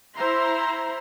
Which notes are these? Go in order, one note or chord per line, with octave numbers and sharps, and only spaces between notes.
E4 C5 E5 A#5 C6